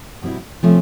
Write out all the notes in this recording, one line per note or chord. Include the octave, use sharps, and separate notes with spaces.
B2 G3 C4 E4
C3 F3 A3 C#4